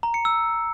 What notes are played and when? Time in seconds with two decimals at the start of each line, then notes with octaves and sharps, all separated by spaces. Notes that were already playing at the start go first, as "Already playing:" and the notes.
0.03 A#5
0.14 C#7
0.25 E6